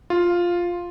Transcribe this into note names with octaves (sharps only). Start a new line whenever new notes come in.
F4